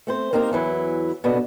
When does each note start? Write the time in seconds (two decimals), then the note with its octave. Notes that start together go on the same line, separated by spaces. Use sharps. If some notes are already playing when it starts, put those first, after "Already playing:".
0.07 A3 C4 C5
0.33 A#3 C4 D#4 G4 A#4
0.52 E2 E3 F#3 E4
1.24 B2 D3 B3